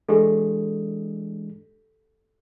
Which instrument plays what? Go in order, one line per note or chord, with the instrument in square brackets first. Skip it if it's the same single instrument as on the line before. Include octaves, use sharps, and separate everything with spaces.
[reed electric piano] E3 G#3 D4 [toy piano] G4 A4